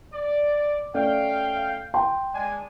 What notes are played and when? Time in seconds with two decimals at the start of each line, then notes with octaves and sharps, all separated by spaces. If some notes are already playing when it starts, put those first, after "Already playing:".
0.13 D5
0.94 A3 C#4 D5 F5 G5
1.94 G5 C6
2.34 G#3 D4 G#5